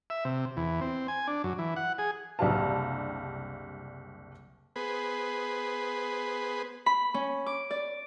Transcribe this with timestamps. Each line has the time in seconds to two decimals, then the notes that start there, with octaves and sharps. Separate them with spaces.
0.10 E5
0.25 C3
0.57 E2
0.81 C4
1.08 G#5
1.27 D4
1.44 F#2
1.58 E3
1.76 F#5
1.98 G#4
2.39 F#1 C2 D4 G4 F5 A5
4.76 B3 G#4 B4 C5
6.86 B5
7.14 C#4
7.46 D6
7.71 D5